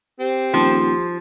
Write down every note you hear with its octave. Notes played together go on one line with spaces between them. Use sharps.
C4 G4
D#1 F3